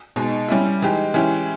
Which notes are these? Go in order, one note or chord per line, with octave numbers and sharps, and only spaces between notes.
B2 G#3 D#4
G3 C#4 E4
E3 G#3 D#4 G4
E3 G#3 C#4 E4 G4